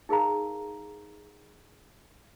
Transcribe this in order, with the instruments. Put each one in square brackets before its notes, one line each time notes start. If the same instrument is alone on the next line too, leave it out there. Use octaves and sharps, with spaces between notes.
[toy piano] D#4 G#4 A#4 F5 A#5